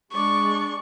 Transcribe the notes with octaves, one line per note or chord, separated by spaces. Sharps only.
G#3 D4 D5 C#6